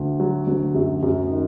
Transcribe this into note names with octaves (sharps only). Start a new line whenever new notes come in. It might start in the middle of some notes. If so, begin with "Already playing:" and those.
Already playing: D2
F#3
D2
F#2
F#2
D#3